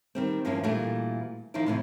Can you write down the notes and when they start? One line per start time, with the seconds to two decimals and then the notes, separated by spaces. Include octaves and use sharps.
0.15 D#3 G3 C4
0.45 E2 G2 F3 A#3 C#4 E4
0.63 A#2 E3 G3 A3 D4 F#4
1.54 D#3 F3 D#4 E4 D5
1.66 A2 C3 E3